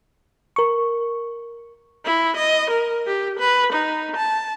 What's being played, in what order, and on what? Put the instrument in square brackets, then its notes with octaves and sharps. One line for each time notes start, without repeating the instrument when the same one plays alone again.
[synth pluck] A#4 C#6
[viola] E4
D#5
A#4
G4
B4
D#4
A5